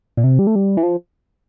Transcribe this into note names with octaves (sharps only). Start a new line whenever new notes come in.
A#2
C3
G3
A3
G3
E3
F3